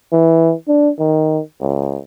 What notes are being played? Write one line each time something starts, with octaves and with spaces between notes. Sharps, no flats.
E3
D4
D#3
C#2